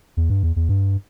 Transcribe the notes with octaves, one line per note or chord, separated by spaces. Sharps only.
E2
G2
E2
E2
G2